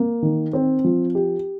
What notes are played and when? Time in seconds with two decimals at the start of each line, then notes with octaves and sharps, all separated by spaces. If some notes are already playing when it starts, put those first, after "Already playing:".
Already playing: A#3
0.22 D#3
0.53 C4
0.84 F3
1.15 G4